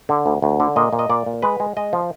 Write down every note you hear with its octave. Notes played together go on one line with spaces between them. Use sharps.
D3
D2
D2
D3
A#2 D#5
A#2
D#5
A#2 D5
A#2
G#3 B4
G#3
G#3 D#5
F3